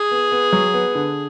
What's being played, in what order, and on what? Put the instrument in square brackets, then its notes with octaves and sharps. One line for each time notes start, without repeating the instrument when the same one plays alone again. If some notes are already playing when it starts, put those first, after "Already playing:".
Already playing: [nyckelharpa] G#4
[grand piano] B3
B3
F#3
B3
D3